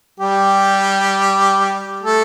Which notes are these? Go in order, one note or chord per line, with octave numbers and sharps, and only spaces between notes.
G3 G4
A3 A4